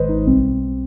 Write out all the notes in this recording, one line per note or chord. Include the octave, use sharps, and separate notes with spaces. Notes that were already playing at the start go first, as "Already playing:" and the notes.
Already playing: G#1 G#2 D#3 G#3 B4 C5 D#5
D#4
B1 B2 G3 C4